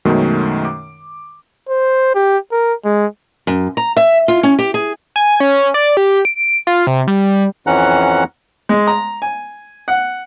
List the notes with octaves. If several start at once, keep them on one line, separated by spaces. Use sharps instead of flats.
F#2 B2 D#3 G#3 A3 C#4
D6
C5
G4
A#4
G#3
F#2
A#5
E5
F4
C#4
G4
G#4
G#5
C#4
D5
G4
D7
F4
C3
G3
F2 E3 C#4 F#5 A#5 F#6
G#3
A#5
G#5
F#5